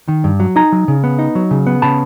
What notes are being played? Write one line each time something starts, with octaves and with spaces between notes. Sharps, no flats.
D#3
G2
F#3
D#4 G#5 A#5
F#3
C#3
B3
D#4
F#3
C#3
B3
C#3 A5 B5